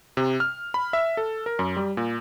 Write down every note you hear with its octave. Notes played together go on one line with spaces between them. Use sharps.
C3
F6
B5
E5
A4
A#4
F#2
G3
A#2